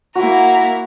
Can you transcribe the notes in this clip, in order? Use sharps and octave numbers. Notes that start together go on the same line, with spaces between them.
A#3 E4 F#4 A#5